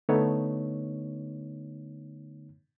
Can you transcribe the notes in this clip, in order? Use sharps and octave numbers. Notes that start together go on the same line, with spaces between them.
D3 A3 B3 D#4 C#5